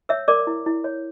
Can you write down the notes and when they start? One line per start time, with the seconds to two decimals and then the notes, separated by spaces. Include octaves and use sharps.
0.09 C#5 E5 E6
0.28 A#4 D5 D6
0.47 E4
0.66 E4
0.84 C#5